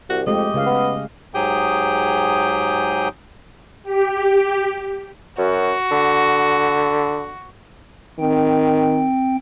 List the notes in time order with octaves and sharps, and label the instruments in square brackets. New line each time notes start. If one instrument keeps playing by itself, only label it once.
[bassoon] C2 [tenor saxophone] F#4
[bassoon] F2 [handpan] G#3 A3 G4 [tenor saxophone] D#5
[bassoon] C#2 [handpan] C#3 F5
[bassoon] B3
[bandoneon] G#2 F#3 G4 G#4 G5 D#6
[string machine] G4
[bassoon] F#2 [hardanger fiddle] F#4
[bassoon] D3
[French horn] D#3 [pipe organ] C4 G5